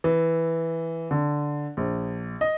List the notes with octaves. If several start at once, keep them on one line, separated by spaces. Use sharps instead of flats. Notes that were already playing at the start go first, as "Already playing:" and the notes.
E3
D3
A#1
D#5